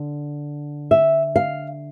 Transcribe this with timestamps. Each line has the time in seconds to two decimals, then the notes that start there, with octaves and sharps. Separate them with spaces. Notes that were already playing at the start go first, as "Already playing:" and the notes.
Already playing: D3
0.91 E5
1.36 F5